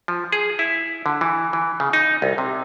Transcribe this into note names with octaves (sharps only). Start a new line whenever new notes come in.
F3
G#4
E4
D3
E3
E3
C#3
D#4
C2
C3